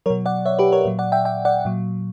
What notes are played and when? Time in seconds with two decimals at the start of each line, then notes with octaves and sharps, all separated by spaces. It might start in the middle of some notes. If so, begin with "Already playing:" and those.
0.06 F#3 A#4 C#5
0.10 B2
0.26 D5 F#5
0.46 C#5 E5
0.59 G4 B4
0.72 A#4 C#5
0.85 A#2 F#3
0.99 D5 F#5
1.12 E5 G5
1.25 E5 G5
1.45 D5 F#5
1.65 A#2 F#3